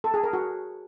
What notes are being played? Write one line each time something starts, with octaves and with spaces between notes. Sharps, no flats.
A4
G#4
A#4
F#4